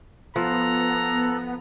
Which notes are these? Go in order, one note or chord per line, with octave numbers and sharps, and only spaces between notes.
F3 B3 A4 A#5 F#6